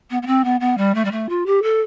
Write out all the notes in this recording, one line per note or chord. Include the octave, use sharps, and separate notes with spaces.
B3
B3
C4
B3
B3
G3
A3
G3
A3
F4
G4
A4